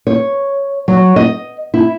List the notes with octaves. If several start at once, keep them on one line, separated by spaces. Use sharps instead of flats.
C#5
F#3
D#5
E4